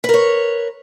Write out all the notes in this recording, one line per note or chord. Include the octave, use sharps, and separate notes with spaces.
A#4 B4 C#5